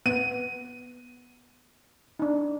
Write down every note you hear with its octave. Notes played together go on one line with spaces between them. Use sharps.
B3 D#7
D4 D#4